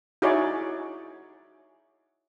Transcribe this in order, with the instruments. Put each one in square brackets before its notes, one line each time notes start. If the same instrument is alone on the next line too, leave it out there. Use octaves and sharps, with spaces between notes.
[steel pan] D#4 E4 F#4 G#4 C#5 D5